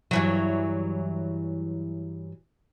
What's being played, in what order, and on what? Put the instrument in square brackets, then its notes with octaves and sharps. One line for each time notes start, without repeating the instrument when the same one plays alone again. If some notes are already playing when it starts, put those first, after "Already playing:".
[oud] G2 E3 F#3